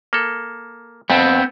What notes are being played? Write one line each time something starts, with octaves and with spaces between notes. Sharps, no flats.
A#3 A4
F2 B3 C4